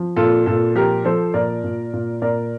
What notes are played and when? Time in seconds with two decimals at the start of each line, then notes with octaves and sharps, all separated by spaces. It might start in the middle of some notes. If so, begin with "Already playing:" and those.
Already playing: F3
0.16 A#2 F4 A4
0.46 A#2 F4 A4
0.75 F3 G4 A#4
1.05 F3 A4 C5
1.34 A#2 A#4 D5
1.64 A#2
1.93 A#2
2.22 A#2 A#4 D5